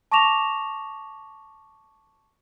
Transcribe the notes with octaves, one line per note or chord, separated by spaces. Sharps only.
A5 C#6 D6 A#6 E7 F7